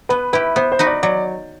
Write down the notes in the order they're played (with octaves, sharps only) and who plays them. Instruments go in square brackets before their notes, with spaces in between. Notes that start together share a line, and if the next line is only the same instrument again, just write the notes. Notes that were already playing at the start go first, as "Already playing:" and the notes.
[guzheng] B3 [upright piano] B4
[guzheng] E4 G4 [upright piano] B4
[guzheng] B3 [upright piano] C5
[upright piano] C5
[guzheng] D#4 F#4 B4
[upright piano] D5
[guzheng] F#3 [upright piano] D5